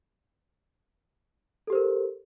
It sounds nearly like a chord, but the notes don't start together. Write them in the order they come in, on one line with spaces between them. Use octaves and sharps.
A4 G4 C5 A#4